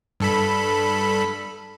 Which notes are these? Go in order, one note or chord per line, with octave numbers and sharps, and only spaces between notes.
G2 A4 B5